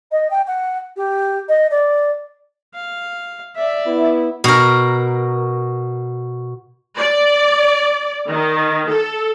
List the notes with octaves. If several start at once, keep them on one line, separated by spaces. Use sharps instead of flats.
D#5
G5
F#5
G4
D#5
D5
F5
D5 E5
B3 E4
B2 A#4
D5
D#3
A4